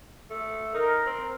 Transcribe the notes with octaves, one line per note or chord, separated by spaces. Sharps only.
A3
D#4 A#4
C4